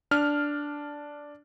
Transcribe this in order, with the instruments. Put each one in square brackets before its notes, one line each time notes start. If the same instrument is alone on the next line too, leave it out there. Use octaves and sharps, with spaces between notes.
[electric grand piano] D4 F6